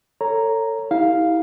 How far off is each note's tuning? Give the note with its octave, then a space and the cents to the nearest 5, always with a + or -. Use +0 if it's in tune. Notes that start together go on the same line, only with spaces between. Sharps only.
A4 +30 C#5 +0 A#5 +0
E4 -35 G4 +0 F5 +0